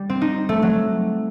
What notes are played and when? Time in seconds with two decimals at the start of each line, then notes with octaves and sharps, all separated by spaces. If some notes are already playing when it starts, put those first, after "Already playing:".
Already playing: G3
0.10 C4
0.22 D#4
0.49 A3
0.62 F#3